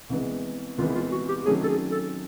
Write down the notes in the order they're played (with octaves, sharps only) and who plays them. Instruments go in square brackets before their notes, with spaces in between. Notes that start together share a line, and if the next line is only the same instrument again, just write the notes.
[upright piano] C2 C3 E3 G#3 B3
[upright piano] C2 C3 E3 G#3 B3 [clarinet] F4
[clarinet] E4
F4
F#4
G4
[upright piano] C3 D#3 F#3 A3 C#4 [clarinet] G#4
[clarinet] A4
G#4
A4